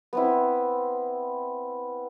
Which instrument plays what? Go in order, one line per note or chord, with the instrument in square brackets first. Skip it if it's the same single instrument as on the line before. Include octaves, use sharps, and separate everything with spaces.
[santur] B3 C4 E4